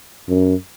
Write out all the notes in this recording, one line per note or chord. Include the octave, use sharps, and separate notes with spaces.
F#2